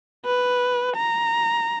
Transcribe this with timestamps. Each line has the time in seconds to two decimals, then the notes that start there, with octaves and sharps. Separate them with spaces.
0.25 B4
0.96 A#5